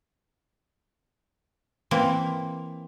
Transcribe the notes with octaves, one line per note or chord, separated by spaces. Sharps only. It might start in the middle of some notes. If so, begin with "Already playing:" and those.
E3 A#3 C4